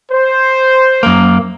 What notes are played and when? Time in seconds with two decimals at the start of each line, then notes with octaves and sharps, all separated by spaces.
0.12 C5
1.03 F#2 A#3